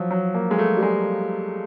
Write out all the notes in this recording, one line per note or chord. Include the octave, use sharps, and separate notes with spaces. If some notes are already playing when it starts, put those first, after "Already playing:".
Already playing: F3 F#3
F#3
A#3
G#3
A3
G3
G#3